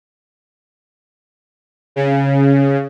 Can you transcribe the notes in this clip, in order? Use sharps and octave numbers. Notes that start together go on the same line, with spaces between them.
C#3